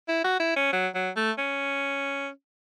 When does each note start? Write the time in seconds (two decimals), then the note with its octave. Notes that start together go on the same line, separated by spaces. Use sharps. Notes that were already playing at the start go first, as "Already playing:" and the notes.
0.08 E4
0.24 F#4
0.40 E4
0.57 C#4
0.73 F#3
0.95 F#3
1.16 A3
1.38 C#4